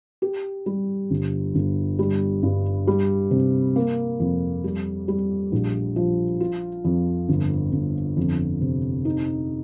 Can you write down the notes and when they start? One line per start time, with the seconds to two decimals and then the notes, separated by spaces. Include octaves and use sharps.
0.22 G4
0.66 G3
1.11 G1
1.55 G1
1.99 G3
2.43 G2
2.87 G3
3.31 C3
3.76 A#3
4.20 F2
4.64 G3
5.08 G3
5.52 A#1
5.96 F3
6.40 F4
6.85 F2
7.29 G1
7.73 G1
8.17 F2
8.61 C3
9.05 D#4